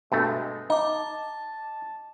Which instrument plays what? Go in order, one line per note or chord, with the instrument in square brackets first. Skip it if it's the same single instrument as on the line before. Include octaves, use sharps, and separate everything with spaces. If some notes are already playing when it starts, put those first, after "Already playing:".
[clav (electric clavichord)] G2 B2 A3 [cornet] G#3
[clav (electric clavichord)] D#4 [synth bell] D#5 D6 [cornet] A5